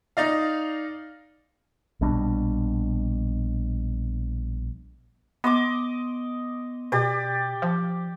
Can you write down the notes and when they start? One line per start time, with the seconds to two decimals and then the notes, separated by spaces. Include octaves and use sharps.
0.17 D#4 D5 F5
2.01 A#1 B2 G3 D4
5.44 B3 D#5 C6 D6
6.92 B2 G4 D5
7.62 F3